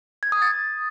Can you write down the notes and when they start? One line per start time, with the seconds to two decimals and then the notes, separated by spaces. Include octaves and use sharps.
0.23 G#6
0.32 D#6
0.42 A6